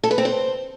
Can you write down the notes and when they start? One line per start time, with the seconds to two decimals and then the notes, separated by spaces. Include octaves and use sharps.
0.03 A4
0.11 B4
0.18 C4
0.25 C5